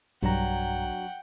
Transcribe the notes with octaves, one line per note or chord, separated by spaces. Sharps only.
B1 G2 F#3 D4 F#5 G5 A#5